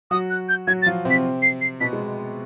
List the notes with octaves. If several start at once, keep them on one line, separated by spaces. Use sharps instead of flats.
F#3 F#4 D#6
F#6
G6
F#3 F#4 G#6
A6
F3 F4
C3 C4
B6
C7
C7
B2 B3 B6
G#3